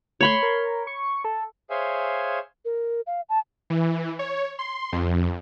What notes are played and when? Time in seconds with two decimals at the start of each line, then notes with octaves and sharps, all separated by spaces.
0.21 A3 C#5 B5 C6
0.43 A#4
0.87 C#6
1.24 A4
1.70 G#4 C5 C#5 E5 F5 G#5
2.65 A#4
3.07 F5
3.29 A5
3.70 E3
4.19 C#5
4.59 C6
4.92 F2